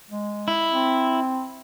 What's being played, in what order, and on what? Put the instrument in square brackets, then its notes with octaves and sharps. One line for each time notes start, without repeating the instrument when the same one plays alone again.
[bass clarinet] G#3
[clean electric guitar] E4
[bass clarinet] C4